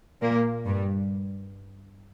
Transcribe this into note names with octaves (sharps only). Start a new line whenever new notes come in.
A#2 A#3
G2 G3